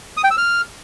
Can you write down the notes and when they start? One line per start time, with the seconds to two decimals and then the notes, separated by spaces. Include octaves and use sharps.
0.17 D#6
0.24 G5
0.31 E6
0.38 F6